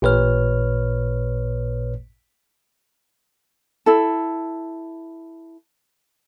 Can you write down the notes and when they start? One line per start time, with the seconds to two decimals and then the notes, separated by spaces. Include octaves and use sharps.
0.02 A1 A#2 B4 C#5 F6
3.86 E4 A4